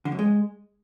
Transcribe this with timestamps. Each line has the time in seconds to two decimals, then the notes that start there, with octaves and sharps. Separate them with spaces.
0.05 D3
0.12 F#2
0.19 G#3